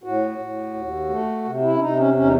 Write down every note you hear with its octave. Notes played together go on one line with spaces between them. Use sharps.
A2 F#4
A2
D#2
A3
C3
E4
C#4
C3 D#4
C#4
E2 C#4
D#4